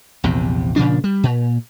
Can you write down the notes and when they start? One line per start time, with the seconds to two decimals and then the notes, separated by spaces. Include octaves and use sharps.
0.24 A#1 E2 C3
0.76 A#2 C#3 F3 D4
1.04 G3
1.23 A#2